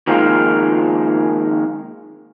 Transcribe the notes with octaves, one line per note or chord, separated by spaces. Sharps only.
D#3 F3 G#3 A#3 C4 F4